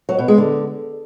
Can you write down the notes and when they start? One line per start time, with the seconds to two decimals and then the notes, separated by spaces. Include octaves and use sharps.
0.09 F#3
0.18 B2
0.28 G#3
0.38 D3